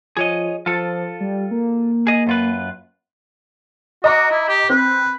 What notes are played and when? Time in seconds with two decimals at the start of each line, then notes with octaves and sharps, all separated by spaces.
0.17 F3 G#4 C#5 D#5
0.66 F3 F4 A4
1.21 G3
1.51 A#3
2.07 G#4 D#5
2.27 F#2 F4 B4
4.04 F#4 D#5 A#5 D6
4.31 E4
4.48 G4
4.70 C4 B4